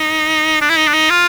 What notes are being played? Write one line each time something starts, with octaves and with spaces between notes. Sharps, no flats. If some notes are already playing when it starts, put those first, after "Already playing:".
Already playing: D#4
D4
E4
D#4
D4
D#4
F4